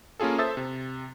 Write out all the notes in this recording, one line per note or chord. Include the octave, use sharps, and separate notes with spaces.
A#3 C#4 F4 G#4 A4
A4 C5 E5 D#6 E6 A6
C3